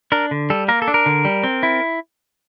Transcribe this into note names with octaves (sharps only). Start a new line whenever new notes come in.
D4 A#4
D3
G3 A4
A#3 A#4
A4
D4
A#4
D3
G3
C4
E4